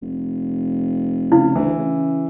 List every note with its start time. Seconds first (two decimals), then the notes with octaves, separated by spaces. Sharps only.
0.02 F1
1.32 C#3 E4
1.55 D2 E3
1.79 C#3